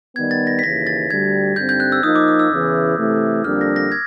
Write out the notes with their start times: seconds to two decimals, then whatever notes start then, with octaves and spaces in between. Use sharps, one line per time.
0.16 D#3 G3 B3 G#6
0.31 A6
0.47 A#6
0.59 B6
0.63 D#2 C#3 E3 A#6
0.87 A6
1.11 D2 D3 G3 G#6
1.56 G2 D3 G3 C4 D#4 G6
1.69 G6
1.80 F#6
1.92 E6
2.03 F3 A#3 D#4 D#6
2.15 D6
2.28 D#6
2.39 E6
2.51 E2 C#3 E3
2.98 C3 E3 A3
3.45 F2 D3 G3 A#3 D4 F6
3.61 A#6
3.76 A#6
3.92 G#6